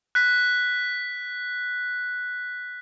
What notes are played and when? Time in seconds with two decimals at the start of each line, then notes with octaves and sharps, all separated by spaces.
0.15 F#6 B6